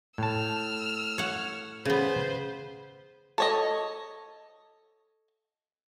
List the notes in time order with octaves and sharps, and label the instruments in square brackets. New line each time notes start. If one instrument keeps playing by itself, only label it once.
[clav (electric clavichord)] A2 A5 [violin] E6 F6
[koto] C#5 F#5
[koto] C#3 B3 [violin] B4 C5
[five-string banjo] A4 C#5 D#5